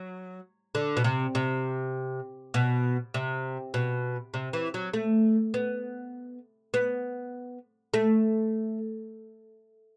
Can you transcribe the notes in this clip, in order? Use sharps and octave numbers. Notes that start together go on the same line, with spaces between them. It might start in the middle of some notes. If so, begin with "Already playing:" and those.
Already playing: F#3
D3
B2
C3
C3
B2
C3
B2
C3
E3
F#3
A3
B3
B3
A3